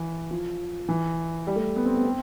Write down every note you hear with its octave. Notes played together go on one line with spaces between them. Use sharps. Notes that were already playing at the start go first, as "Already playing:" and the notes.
Already playing: E3
F3
E3
G3
A3
B3
C4
B3
C4